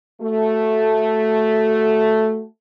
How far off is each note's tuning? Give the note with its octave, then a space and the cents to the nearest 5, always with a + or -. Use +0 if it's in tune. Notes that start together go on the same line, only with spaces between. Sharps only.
A3 +0 F#4 +0